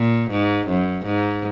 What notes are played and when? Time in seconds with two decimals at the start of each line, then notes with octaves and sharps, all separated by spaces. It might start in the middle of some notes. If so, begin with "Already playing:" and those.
Already playing: A#2
0.31 G#2
0.68 F#2
1.06 G#2